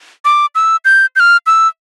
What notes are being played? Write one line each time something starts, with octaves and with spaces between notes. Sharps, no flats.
D6
E6
G6
G6
F6
E6